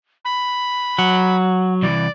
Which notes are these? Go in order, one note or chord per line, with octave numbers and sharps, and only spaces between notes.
B5
F#3 F#5
C2 E3 D5